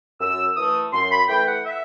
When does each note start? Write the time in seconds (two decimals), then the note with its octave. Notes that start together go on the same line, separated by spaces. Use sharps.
0.20 F#2 E6
0.56 E3 A3 D#6
0.92 F#2 C6
1.10 B5
1.28 E3 A3 G5
1.46 F#5
1.65 E5